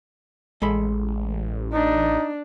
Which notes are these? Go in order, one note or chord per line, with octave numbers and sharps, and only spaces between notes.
A1 G#3 A4 B5
D4 D#4